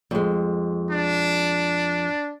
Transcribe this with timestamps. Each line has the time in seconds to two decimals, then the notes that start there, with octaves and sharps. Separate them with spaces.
0.11 F2 G#3
0.90 D4